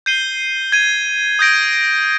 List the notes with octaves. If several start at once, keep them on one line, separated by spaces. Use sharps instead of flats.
G6 C7 D#7 G7
G#6 D#7 G7
D#6 G6 A#6 D7